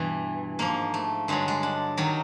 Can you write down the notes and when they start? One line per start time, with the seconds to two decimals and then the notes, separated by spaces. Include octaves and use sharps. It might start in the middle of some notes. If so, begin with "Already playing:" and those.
Already playing: G2 B2 E3
0.59 G#2 F3 A#3
0.94 A3
1.28 G2 D3 F#3 G#3
1.48 G#3
1.63 D4
1.97 D#3 F#3 D#4